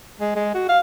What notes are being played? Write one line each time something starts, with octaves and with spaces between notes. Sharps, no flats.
G#3
G#3
F#4
F5